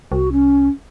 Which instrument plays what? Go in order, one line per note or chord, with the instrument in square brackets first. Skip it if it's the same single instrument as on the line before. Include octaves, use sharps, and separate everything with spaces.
[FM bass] C2 [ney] F#4
[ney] C#4